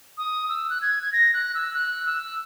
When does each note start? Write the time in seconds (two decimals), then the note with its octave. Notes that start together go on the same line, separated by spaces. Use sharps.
0.18 D#6
0.49 E6
0.70 F#6
0.82 G#6
1.03 G#6
1.13 A#6
1.34 F#6
1.55 E6
1.74 F#6
2.06 E6